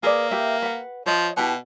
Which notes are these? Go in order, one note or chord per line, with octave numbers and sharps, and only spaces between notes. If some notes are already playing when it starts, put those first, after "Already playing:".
A#3 G#4 B4 D5
G4 B4 E5
B4 F#5
F3 C#5 D#5
B2 E4 G4 A5